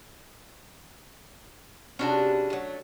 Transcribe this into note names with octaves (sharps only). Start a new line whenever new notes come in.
C3 C#4 D4 E4 F#4 G#4
F#3 A3